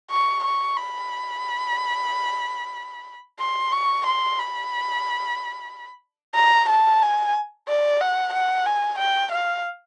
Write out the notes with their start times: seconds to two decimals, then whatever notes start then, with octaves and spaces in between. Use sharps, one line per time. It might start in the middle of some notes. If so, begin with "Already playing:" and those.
0.11 C#6
0.44 C#6
0.76 B5
3.39 C6
3.72 C#6
4.06 C6
4.39 B5
6.35 A#5
6.69 A5
7.02 G#5
7.68 D5
8.01 F#5
8.33 F#5
8.66 G#5
8.99 G5
9.32 F5